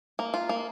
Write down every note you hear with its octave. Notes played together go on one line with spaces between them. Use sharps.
A#3
F4
A#3